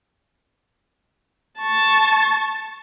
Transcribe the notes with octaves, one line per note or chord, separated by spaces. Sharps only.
A5 C#6